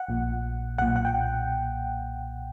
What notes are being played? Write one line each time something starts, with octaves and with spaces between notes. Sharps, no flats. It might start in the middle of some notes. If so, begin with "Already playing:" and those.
Already playing: F#5
A#1 A#2
B1 A#2 F#5
F#5
G5